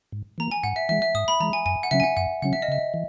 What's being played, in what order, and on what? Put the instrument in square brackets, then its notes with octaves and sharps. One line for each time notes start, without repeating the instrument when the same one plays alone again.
[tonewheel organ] G#2
[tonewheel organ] E3 A#3 [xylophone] A#5
[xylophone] G#5
[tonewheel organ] G#2 [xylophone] F#5
[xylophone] E5
[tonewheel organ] E3 G#3 [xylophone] E5
[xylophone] E5
[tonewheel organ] G#2 [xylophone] D#6
[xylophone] B5
[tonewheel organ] E3 G#3 [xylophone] A#5
[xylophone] G#5
[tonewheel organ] F#2 [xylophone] G#5
[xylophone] F#5
[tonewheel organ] C#3 F#3 C#4 [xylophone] E5
[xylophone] G#5
F#5
[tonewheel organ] F#2 [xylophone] F#5
[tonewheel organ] C#3 F#3 C#4 [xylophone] F#5
[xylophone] E5
D#5
[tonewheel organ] C#3 [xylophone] E5
[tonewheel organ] E3